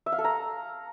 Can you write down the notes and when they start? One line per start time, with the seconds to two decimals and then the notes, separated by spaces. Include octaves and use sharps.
0.06 E5
0.12 F5
0.18 A4
0.24 A#5